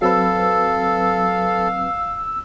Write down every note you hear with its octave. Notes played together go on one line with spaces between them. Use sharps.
F#3 C4 A4 B4 F5 E6